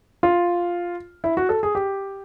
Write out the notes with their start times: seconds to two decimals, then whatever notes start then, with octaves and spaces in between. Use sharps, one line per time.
0.23 F4
1.24 E4
1.37 F#4
1.49 A4
1.63 G#4
1.75 G4